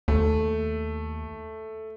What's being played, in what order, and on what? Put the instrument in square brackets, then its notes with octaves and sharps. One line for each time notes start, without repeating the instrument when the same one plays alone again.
[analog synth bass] D#2 [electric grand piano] A3